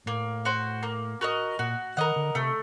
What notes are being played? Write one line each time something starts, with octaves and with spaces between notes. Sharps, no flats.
A2 A#3
F#4 C5
A#3
F#4 A#4 D#5
A#2 F#4
D#3 A#4 D#5 F#5
D3
C3 A3